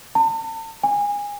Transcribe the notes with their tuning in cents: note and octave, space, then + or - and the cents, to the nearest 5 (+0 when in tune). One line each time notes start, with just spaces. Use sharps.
A5 +40
G#5 -25